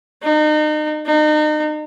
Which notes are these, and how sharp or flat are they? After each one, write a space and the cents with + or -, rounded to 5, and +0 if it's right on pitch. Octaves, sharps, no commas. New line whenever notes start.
D#4 -35
D#4 -35